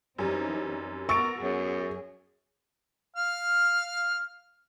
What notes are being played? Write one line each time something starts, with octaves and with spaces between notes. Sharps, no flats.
F#2 E3 G3 C4 D#4
B3 F#4 A#4 C#6 E6 A6 D7
F#2 G#4
F5 F6